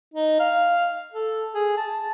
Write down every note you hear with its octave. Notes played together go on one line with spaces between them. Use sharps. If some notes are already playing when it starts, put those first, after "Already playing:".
D#4
F5
A4
G#4
A5